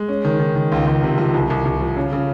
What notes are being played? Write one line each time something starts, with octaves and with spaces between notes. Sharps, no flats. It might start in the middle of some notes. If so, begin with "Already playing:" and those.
Already playing: G#3
C#4
D#3
D#3
D#3
C#2
C#2
C3
F3
C2
C2
C2
F3
C#3
C#3